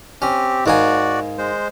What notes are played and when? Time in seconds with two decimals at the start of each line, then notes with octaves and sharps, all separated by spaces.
0.22 C4 C#4 G4
0.66 G#2 A#3 F#4 D5 G#5
1.38 G#3 C5